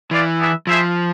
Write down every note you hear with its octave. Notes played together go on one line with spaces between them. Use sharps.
E3 F4 B4 D5 F5
B3 D4 G#4 B4 E5
F3 E4 G#4 C5 E5